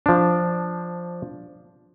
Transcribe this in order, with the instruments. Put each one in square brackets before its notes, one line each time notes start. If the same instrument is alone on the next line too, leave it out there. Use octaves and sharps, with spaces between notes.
[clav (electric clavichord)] F3 D4